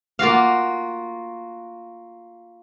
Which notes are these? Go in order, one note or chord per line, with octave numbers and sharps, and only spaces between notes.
A#3 F4 F#4 F5